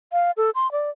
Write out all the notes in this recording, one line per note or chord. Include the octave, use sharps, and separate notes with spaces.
F5
A4
C6
D5